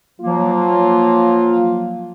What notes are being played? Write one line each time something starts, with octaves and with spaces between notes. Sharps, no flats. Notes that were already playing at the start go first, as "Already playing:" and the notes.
F3 F#3 A#3 F4